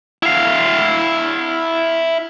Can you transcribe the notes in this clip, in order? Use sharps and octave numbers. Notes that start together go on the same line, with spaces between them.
E4 F5